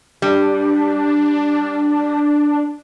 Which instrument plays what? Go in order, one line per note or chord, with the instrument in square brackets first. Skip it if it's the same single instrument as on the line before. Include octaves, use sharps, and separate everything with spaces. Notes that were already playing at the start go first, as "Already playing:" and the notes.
[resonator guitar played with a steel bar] G3 [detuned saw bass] D4